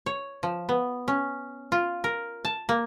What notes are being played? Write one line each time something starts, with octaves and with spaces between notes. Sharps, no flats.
C#5
F3
B3
C#4
F4
A#4
A5
A#3